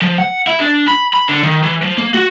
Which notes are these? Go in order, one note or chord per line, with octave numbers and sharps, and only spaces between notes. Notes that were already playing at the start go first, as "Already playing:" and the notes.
F3
F#5
E4
D4
B5
B5
D3
D#3
E3
F3
A#3
F#4